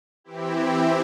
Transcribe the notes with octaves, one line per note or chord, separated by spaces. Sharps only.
E3 C4 E4 G4